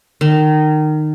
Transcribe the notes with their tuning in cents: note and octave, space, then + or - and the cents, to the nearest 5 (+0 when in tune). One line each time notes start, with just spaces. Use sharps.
D#3 -20